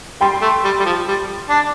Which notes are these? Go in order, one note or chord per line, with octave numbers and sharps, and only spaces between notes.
G3 G5 C6
A3
G3
G3
F3
G3
D4